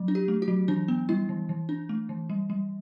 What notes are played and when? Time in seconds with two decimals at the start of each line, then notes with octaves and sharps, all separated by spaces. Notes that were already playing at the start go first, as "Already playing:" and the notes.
Already playing: F#3
0.08 D4
0.15 G4
0.28 A3
0.42 F#4
0.48 F#3
0.68 E3 D4
0.88 B3
1.09 G3 E4
1.29 E3
1.49 E3
1.69 D4
1.89 A3
2.09 E3
2.30 G3
2.50 G3